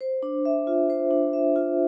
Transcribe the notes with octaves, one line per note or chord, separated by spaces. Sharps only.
C5
D4
E5
F4
C5
D4
E5
F4